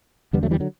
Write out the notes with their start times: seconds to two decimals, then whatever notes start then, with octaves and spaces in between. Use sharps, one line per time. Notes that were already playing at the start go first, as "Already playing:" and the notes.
0.33 E2 D3 G3 B3
0.43 F#3 A3
0.51 E3 G3
0.60 D3 F#3